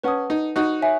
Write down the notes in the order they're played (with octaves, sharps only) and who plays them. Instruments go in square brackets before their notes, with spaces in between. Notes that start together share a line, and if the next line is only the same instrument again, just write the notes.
[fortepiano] C#4 [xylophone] B4 F#5 A5 D#6
[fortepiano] D#4
D#4 F#4
[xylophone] C#5 E5 G#5